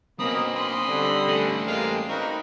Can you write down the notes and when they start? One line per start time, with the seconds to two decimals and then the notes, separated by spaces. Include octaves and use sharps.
0.19 B2 A#3 C4 C#4 A#5 B5 D#6
0.56 D#5 B5 C6
0.88 D3 G3
1.28 A3 C#4
1.67 G3 G#3 A#3 C4 F4 F5
2.09 A#3 C4 D#4 F#4 A#4 B4